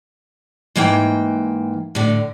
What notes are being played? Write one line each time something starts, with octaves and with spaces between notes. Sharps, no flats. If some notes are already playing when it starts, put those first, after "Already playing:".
G#2 E3 A#3 G5
A2 D3